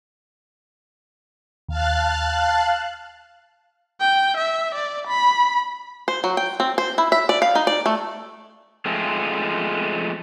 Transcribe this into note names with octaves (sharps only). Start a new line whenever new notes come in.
D#2 F5 A5 F#6
G5
E5
D5
B5
C5
F#3
G5
C4
C5
E4
E5
D5
F5
D#4
D5
A3
F3 G#3 A3 C4